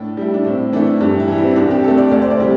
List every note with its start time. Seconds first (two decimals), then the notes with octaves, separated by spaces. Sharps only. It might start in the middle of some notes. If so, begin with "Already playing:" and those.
Already playing: A2 D4
0.17 G3 E4
0.34 D4
0.45 A2 C4
0.72 E3 A3 D4
1.01 G2 D4
1.20 E4
1.28 E3 G3
1.38 C4
1.51 C4
1.56 C2 D4
1.71 G4
1.83 C3 A3 A4
1.98 D5
2.11 D2 D5
2.22 C5
2.30 D5
2.39 C3 G3